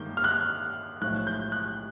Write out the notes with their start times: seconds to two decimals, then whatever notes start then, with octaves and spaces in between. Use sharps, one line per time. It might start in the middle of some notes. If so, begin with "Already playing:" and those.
Already playing: G2 D#3 A#3 G6
0.17 F6
0.24 F#6
1.01 B1 A2 F3 F#6
1.27 G6
1.52 F#6